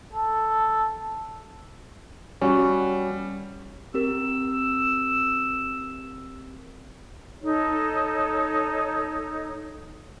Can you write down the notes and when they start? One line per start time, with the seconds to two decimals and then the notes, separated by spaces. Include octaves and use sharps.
0.13 A4
2.41 G3 C#4 F#4
3.94 C4 G4 A#4 E6
7.43 D#4 A4 C#5